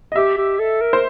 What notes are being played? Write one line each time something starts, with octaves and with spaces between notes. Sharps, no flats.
D#5
G4 E5
G4
A4
A#4
C5